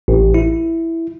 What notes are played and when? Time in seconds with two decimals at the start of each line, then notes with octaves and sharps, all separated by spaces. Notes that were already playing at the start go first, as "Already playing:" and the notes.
0.08 A1
0.34 E4